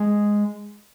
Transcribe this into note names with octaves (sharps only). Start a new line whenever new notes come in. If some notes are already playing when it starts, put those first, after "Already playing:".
Already playing: G#3